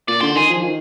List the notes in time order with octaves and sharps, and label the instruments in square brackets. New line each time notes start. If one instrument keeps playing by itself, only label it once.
[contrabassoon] A#2 [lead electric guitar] D5
[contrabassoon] D3 [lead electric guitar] C5
[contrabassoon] D#3 [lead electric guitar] G#4
[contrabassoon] F3
D#3